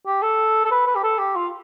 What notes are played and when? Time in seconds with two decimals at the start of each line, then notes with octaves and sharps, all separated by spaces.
0.06 G4
0.23 A4
0.65 A4
0.71 B4
0.87 B4
0.96 G4
1.03 A4
1.19 G4
1.36 F4